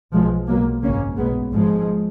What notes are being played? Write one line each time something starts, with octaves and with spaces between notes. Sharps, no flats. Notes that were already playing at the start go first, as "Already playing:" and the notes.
B1 B2 F3 G#3
B1 B2 F#3 A#3
G#1 F#2 C#3 A#3 C#4
B1 B2 G#3 B3
G#1 G#2 F3 G#3